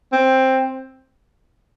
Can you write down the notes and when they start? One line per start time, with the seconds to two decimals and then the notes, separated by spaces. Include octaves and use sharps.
0.12 C4